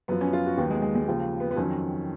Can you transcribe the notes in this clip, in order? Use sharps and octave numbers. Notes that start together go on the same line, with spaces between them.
F#2 F3 B3
C#4
F4
F#4
D#2 D#3 F#3 B3
G#3
G#3
G#3
D#2 C#3 F3
B3
B3
F2 D#3 F#3 C#4